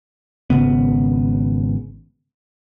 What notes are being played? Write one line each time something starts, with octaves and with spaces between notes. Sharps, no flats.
G#1 C#3 B3